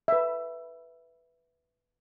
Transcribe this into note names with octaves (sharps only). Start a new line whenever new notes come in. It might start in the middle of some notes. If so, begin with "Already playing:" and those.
B4 E5